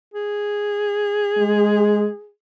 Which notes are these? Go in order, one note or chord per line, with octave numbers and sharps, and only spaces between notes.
G#4
G#3